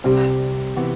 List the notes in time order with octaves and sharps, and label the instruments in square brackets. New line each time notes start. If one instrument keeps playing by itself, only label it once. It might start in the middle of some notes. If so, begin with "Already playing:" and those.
[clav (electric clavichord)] C2 C3 G3 C4 [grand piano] G4
[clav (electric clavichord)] C3 E3 B3 F#4